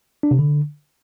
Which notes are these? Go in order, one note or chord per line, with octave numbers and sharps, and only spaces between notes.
D4
C3
D3